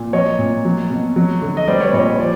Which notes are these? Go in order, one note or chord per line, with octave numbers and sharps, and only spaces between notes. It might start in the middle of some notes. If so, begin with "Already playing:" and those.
Already playing: A#2
F#3 C#5 D#5
A#2
F#3
B2
F#3
D3
D#5
G3 C5 D5
B4 C#5
A#2 C#5 D#5
C#5
F3 C5 D5